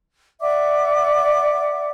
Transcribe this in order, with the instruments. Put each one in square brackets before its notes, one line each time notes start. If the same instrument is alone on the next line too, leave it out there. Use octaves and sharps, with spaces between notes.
[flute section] D5 E5 F#5 D6